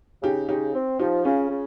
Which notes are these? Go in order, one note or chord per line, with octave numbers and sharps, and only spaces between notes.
C#3 D#4 G4
C#3 D#4 G4
C4
F3 D#4 G4
C#3 C#4 F4
C#3